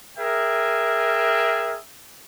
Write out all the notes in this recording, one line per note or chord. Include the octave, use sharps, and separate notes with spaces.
G#4 A#4 E5 G5